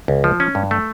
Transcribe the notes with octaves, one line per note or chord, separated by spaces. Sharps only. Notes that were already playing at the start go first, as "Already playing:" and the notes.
C#2
F3
C#4
G2
A3